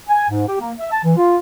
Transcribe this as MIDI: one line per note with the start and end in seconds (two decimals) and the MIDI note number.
0.09 0.26 80
0.29 0.47 44
0.48 0.56 67
0.60 0.72 58
0.79 0.89 76
0.92 1.01 81
1.05 1.16 52
1.17 1.37 65